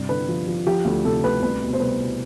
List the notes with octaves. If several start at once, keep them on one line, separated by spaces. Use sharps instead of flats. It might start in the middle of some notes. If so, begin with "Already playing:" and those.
Already playing: G2 C3
D3 B4
F3
F3
F3 G4
D2
C3 A4
D2 B4
C2 B4
B2
C5
C2 B4
B2